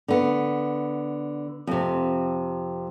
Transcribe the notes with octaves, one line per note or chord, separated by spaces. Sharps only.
D3 B3
F2 C3